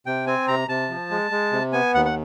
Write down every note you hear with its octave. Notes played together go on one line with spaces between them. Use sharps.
C3 G5
C4 G#5
C3 A#5
C3 A5
F3
G#3
G#3
C3
B3 G#5
D#2 F#5
F#5